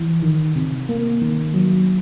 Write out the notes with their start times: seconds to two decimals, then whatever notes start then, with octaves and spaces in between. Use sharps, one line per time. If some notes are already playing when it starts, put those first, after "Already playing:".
Already playing: E3
0.22 D#3
0.56 C3
0.89 A#3
1.22 D#3
1.54 F#3